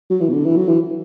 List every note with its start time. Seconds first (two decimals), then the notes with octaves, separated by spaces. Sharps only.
0.10 F#3
0.21 E3
0.28 B2
0.33 D3
0.46 E3
0.57 F#3
0.68 E3